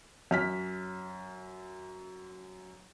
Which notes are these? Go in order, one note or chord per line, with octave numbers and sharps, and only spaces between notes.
F#2 F6 B6